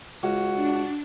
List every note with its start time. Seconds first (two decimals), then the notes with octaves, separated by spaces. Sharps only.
0.23 C#2 F#4
0.56 D4